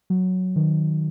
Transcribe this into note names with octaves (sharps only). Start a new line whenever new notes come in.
F#3
D#3